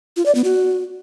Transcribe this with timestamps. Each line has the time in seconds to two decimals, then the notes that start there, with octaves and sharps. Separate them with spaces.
0.16 F4
0.26 D5
0.35 B3
0.44 F#4